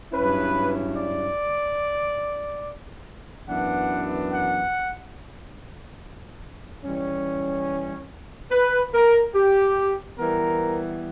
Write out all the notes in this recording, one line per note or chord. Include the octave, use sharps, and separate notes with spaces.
G2 F#3 C#4 E4 B4
D5
F#2 E3 B3 D4 F#5
F#5
E3 G3 C#4
B4
A#4
G4
E3 G3 B3 A#4